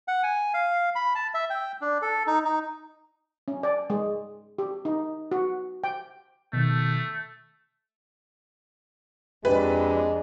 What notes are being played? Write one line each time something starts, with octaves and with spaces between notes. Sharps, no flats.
F#5
G#5
F5
B5
A5
E5
G5
D4
A4
D#4
D#4
C#4
D5
G#3
G4
D#4
F#4
G5
B2 D#3 A3
F2 G#3 D4 G4 B4